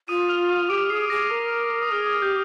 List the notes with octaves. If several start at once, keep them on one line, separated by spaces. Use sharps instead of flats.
F4 D#6 D#7
F6 F7
D#6 D#7
G4 D6 D7
G#4 C7
G#4 A#6
A#4
D#6
G#4 F6
D#6
G4 G6